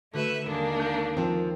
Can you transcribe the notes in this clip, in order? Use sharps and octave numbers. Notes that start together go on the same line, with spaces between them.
D3 A3 F#4 B4 E5
D#2 G#3 A#3 D4
F#6 G6
F3 C4